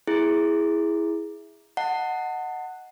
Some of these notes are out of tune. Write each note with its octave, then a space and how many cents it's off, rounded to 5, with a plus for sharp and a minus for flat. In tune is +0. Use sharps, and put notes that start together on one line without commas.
E4 +0 G#4 +0
D#5 +0 F#5 +0 A5 +35